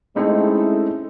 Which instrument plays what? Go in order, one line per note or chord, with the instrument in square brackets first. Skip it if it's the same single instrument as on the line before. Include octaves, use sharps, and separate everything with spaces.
[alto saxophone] G#3 [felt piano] A3 C4 D#4 [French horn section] C#4 E4 A4